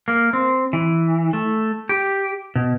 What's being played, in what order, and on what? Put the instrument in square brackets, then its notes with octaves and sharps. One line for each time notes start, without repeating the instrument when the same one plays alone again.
[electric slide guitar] A#3
C4
E3
A3
G4
B2